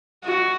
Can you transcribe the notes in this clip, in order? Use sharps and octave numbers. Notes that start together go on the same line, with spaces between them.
F#4